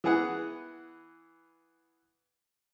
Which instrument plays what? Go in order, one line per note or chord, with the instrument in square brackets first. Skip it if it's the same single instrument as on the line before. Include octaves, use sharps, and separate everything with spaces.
[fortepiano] E3 B3 G#4 F#5